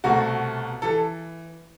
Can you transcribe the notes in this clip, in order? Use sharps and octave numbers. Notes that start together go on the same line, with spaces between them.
C2 B2 A3 F#4
E3 A4